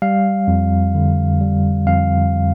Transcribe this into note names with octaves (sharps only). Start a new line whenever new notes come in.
G3 F5
F2
D3
G3
F2 F5